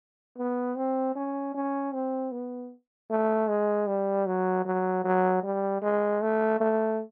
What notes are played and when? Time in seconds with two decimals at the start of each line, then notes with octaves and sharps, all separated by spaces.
0.38 B3
0.77 C4
1.15 C#4
1.54 C#4
1.94 C4
2.31 B3
3.10 A3
3.49 G#3
3.87 G3
4.26 F#3
4.65 F#3
5.04 F#3
5.43 G3
5.82 G#3
6.21 A3
6.60 A3